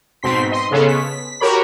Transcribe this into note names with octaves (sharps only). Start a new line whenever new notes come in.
G#2 B2 C4 C6 B6
D#5 C6
C#3 B3 C#4 G#4 A4
B6
F#4 G4 A#4 C#5 B5